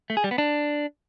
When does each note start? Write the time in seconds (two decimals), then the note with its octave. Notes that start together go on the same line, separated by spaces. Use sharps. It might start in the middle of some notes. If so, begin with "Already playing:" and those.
0.10 A3
0.17 G#4
0.24 G3
0.31 B3
0.38 D4